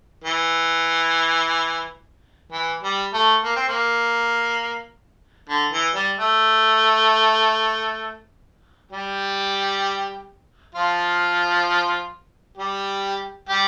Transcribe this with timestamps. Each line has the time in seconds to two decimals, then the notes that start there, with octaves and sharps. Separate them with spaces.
0.24 E3
2.52 E3
2.83 G3
3.13 A3
3.44 A#3
3.56 C4
3.68 A#3
5.49 D3
5.73 E3
5.95 G3
6.18 A3
8.92 G3 G4
10.75 F3 F4
12.57 G3 G4
13.49 G3 G4